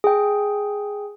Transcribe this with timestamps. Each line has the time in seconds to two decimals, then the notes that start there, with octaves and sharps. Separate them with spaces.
0.04 G#4 G5